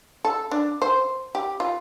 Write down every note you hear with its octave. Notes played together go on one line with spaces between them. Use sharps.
A4
D4
C5
G4
F4